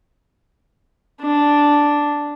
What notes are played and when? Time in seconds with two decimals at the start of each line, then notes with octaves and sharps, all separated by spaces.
1.21 D4